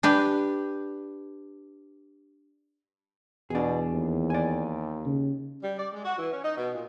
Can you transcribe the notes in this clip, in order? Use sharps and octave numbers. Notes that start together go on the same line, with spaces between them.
D4 G4 B4
E2 B2 D4 G#4
D#2
D5 G#5
C#3
G3
D5
G#3
F#4
E3
C#4
D#4
B2
A#2